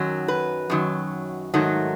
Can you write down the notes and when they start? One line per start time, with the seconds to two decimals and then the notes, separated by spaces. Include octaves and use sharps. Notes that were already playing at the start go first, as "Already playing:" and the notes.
Already playing: F#2 D#3 F#3
0.28 B4
0.70 F#2 D#3 F#3
1.54 G#2 D#3 F#3 A3